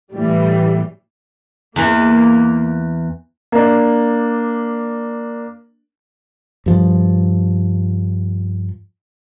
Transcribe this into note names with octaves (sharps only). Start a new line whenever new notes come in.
A2 E3 G3
E2 E3 A#3
A#3 D4
G2 F3